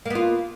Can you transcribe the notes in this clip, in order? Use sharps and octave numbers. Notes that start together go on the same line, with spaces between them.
A#3 B3 F4